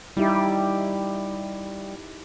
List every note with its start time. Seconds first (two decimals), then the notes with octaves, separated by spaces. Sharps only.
0.17 G3 D#4 E4 G4